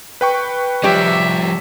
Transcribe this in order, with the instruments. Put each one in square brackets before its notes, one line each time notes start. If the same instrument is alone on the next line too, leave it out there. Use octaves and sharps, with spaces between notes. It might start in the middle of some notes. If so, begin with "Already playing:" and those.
[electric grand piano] B4 G5 C#6
[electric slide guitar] F3 G3 [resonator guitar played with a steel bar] G4 C#5 D5 [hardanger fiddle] E5